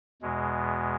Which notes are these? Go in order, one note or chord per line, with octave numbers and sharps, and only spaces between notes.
E2 B2 G#3